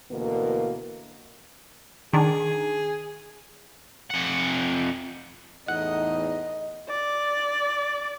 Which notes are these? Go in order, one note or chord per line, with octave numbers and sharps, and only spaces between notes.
D2 B2 D3 E3 A#3
D#3 D4 G#4
F2 F#5
E2 A2 D#4 D#5 F#5
D5